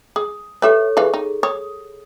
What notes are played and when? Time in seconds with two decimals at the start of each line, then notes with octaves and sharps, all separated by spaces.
0.16 G#4 D#6
0.62 G4 A4 B4 C#5 E5
0.97 E3 G4 G#4 B4 F5
1.14 D#4
1.43 C#5 D#6